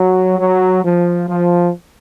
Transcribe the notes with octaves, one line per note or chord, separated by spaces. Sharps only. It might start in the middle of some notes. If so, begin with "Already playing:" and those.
Already playing: F#3
F#3
F3
F3